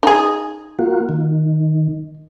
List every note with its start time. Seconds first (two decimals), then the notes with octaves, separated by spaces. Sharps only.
0.03 D#4 G#4
0.79 A#3 F4 F#4
1.09 D#3